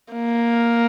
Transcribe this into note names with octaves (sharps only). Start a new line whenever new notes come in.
A#3